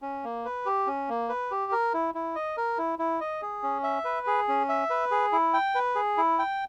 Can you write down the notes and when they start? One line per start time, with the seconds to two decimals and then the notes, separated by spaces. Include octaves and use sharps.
0.02 C#4
0.24 A#3
0.45 B4
0.66 G4
0.87 C#4
1.09 A#3
1.29 B4
1.51 G4
1.72 A#4
1.94 E4
2.15 E4
2.35 D#5
2.57 A#4
2.78 E4
2.99 E4
3.20 D#5
3.42 G#4
3.63 C#4
3.83 E5
4.05 B4
4.27 G#4
4.48 C#4
4.69 E5
4.90 B4
5.11 G#4
5.32 E4
5.53 G5
5.75 B4
5.95 G#4
6.17 E4
6.39 G5